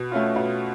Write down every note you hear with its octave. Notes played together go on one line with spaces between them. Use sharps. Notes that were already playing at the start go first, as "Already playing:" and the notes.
Already playing: B2
A3 C#4 F4
B2